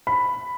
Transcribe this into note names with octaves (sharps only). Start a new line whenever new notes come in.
B5